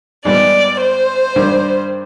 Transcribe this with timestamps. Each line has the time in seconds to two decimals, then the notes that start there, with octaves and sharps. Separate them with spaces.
0.25 G#2 G3 B3 D5
0.81 C5
1.36 G2 D#3 G3